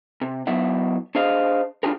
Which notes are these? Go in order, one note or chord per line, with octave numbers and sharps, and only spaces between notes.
C3
F#3 B3 E4 E5 F#5
D4 G#4 C5 D#5 F5
D4 D#4 F4 G4 G#4 A#4